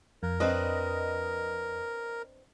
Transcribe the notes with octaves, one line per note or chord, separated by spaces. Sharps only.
F2 A#4
C4 D4 B4 D#5